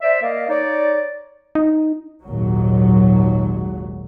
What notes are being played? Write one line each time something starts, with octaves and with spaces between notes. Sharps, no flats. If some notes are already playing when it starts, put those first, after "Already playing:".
C5 D5 E5
A#3 A#4 D5 D#5 F5
D#4 C#5 D5
D#4
G#1 D#2 A#2 F#3